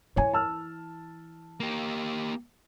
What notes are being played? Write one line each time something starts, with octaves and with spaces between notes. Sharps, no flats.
E3 E4 C#5 G#5
A5 E6 F6
A#3 G4